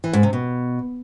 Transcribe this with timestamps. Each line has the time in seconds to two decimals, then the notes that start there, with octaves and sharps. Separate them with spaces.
0.04 E3
0.13 G#2
0.23 C3
0.33 B2